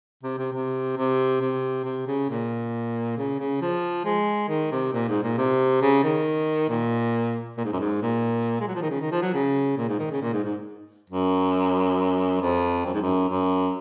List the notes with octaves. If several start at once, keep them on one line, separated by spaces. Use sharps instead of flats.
C3
C3
C3
C3
C3
C3
C#3
A#2
C#3
C#3
F3
G#3
D#3
C3
A#2
G#2
A#2
C3
C#3
D#3
A#2
A#2
G#2
F#2
G#2
A#2
G#3
F#3
F3
D#3
C#3
D#3
F3
F#3
C#3
A#2
G#2
D#3
C#3
A#2
G#2
G#2
F#2
F2
F#2
G#2
F#2
F#2